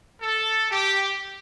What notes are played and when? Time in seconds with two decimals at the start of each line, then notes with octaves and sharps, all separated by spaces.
0.20 A4
0.70 G4